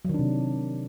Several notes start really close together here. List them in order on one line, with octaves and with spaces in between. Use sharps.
F#3 D#3 D4 C3